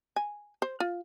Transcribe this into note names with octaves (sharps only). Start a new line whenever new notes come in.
G#5
C5
F4